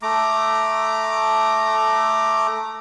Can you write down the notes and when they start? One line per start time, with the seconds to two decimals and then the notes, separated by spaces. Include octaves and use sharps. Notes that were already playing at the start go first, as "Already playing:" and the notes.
0.02 A3 A#5 D6